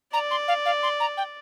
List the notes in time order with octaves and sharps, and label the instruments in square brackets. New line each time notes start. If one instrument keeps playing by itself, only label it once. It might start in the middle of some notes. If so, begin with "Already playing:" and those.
[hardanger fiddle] D5 [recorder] A#5
[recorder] C6
F5
F5
C6
A#5
G5